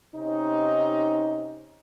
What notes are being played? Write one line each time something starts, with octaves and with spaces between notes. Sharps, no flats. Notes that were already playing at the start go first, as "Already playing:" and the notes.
C3 C#4 D#4